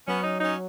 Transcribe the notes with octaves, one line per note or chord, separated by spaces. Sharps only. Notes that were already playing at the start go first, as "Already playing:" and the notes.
F#3 B3 C#4
C#4 D#4
C#4 D#4